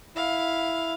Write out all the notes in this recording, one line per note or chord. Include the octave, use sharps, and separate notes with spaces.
E4 F5